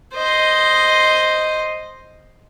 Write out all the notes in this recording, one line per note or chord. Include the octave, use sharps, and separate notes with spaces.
C5 D#5